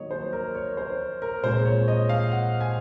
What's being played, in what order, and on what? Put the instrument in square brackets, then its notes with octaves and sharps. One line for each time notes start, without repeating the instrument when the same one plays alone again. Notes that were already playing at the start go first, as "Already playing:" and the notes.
Already playing: [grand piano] D#3 F#3 A#3 C#5 D#5
C5
A#4
C#5
C5
A#4
A#2 G#3 C4 C5
C#5
D#5
F5
F#5
G#5